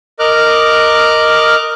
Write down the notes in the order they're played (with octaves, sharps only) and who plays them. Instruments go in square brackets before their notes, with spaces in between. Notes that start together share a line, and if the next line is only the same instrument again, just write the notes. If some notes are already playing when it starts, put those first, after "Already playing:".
[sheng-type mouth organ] A#4 D#5 D6 F6 F#6